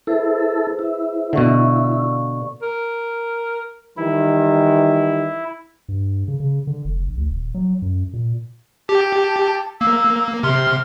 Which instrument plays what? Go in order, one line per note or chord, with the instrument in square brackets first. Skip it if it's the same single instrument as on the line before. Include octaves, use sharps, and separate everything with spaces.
[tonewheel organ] E4 A4 [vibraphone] G#4 B4 C5
[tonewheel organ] E4
[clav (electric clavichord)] B2 D3 [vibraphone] D5 F5 C#6
[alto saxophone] A#4
[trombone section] D#3 E3 G3 [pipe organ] E4
[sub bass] G2
C#3
C#3
D3
F1
A#1
D2
D#1
F#3
F#2
A#2
[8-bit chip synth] G4 [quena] A5
[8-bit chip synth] A#3 [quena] E6
[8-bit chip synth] C3 C6 [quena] F6